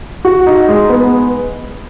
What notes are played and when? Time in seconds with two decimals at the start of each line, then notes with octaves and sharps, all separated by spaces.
0.25 F#4
0.47 D#4
0.68 G#3
0.89 B3